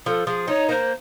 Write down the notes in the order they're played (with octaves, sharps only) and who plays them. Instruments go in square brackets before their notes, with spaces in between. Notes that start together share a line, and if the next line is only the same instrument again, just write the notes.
[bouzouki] F3 [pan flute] A4
[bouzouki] F3 [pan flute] G#4
[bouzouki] D#4 [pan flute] C#5
[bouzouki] A#3 [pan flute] C5